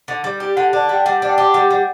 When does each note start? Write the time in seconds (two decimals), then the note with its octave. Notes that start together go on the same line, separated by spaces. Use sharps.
0.08 D3
0.24 G3
0.40 G4
0.57 D3 F#5
0.73 D4
0.89 G3 G5
1.06 G3 F#5
1.22 D4
1.29 G5
1.38 G4
1.54 G3 F#5
1.70 G3 F#5